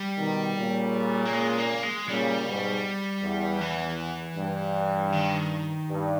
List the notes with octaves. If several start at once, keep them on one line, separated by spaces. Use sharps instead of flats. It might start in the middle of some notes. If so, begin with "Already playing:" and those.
Already playing: G3
B2 D#3
A#2 C#3
A#3
G#3
A#3
G#3
A#2 C#3 G3
G#2 B2
E2
E3
G2
D#3
G2